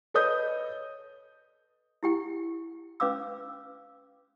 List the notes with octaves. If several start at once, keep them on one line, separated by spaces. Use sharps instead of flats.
A4 B4 C#5 D#5 D#6 G6
E4 G4 G5
C#4 B4 F5 D6 E6